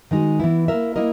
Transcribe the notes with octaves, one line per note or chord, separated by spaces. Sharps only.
D#3 G#3 D#4 F#4
E3 B3 E4
A#3 E4 A#4 E5
A#3 E4 A#4 D#5